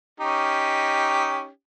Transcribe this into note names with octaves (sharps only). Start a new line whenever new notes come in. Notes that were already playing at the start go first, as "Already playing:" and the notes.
C#4 D#4 G4